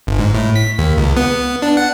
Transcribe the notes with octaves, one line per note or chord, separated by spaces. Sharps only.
G1
G#2
A2
B6
D#2
C#2
B3
D4
F#5